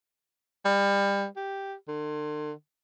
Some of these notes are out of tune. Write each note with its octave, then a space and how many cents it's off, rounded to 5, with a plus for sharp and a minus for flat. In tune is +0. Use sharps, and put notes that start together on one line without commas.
G3 +30
G4 +0
D3 +45